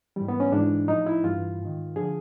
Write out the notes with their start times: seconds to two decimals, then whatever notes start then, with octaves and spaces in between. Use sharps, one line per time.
0.16 G#2 E3 G3
0.28 B3
0.40 C#4
0.52 G#2 E3 D4
0.88 A2 F3 D#4
1.06 E4
1.24 G2 E3 F4
1.60 G#2 D#3
1.96 D3 F3 G#4